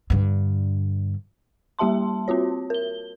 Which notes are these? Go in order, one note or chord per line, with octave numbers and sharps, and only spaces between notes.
G2 D3
G3 A#3 G4 E5 A5 C6
C4 F4 F#4 C#5
A#4 G7